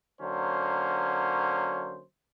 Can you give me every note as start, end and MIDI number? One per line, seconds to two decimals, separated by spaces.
0.21 2.02 50
0.21 2.02 54
0.21 2.02 58
0.21 2.02 61
0.21 2.02 72